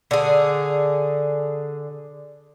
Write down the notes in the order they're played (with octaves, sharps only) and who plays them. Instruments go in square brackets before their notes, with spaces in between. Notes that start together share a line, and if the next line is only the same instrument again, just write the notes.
[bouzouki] D3 G#4